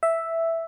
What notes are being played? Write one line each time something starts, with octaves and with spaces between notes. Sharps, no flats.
E5